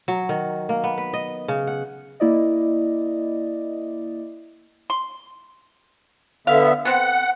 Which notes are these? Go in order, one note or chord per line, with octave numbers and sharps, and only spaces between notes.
F#3
D#3
A#3
B3
B4
D#5
C#3
F#5
A#3 E4 D5 D#5
C6
D3 B3 E5 F5
B3 C4 F#5